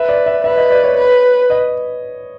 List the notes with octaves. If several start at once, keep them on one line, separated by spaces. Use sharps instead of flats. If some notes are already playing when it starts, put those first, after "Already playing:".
Already playing: B4 E5
D5
E5
B4 E5
D#5
D5
C#5
B4
D#5